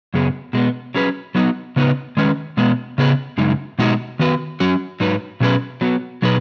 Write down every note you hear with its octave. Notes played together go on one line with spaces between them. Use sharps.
F#2 C#3 B3 G#4
B2 G#3 B3
F#3 C#4 G#4 B4
F#3 B3 D#4 F#4
C#3 B3 D#4 B4
D#3 G#3 C#4 B4
B2 G#3 B3
C#3 B3 G#4 B4
F#2 C#3 G#3 D#4
B2 G#3 D#4 F#4
D#3 B3 F#4 B4
F#3 C#4 F#4
G#2 F#3 D#4 B4
B2 F#3 C#4 G#4 B4
F#3 B3 F#4
B2 F#3 D#4 G#4 B4